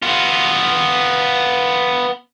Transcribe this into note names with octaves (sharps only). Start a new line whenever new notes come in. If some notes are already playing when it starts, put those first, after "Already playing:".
B3 F4